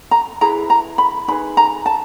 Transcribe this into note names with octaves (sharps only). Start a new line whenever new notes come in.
A#5
E4 G#4 B4 A#5
A#5
B5
D#4 G#4 B4 B5
A#5
A5